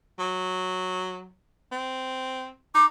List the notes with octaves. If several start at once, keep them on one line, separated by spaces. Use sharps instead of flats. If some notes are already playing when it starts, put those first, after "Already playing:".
F#3
C4
D#4 D6